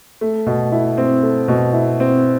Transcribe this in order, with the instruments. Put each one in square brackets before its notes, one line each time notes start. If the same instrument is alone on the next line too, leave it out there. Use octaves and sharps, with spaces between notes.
[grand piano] A3
B2
E4
C4
A3
B2
E4
C4